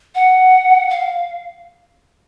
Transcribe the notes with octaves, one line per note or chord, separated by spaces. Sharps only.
F#5
F5